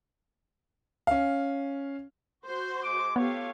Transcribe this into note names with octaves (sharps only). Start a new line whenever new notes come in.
C#4 F5
F#4 C5
G#3 D6
A3 B3 F4 G4 C#5 F5